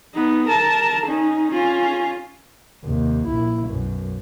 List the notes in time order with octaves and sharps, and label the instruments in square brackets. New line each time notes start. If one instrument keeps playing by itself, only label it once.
[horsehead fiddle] B3 D#4
A#4 A5
C#4 D#4
C#4 F4
[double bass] D#2 C3
A#1 E4
B1 F#2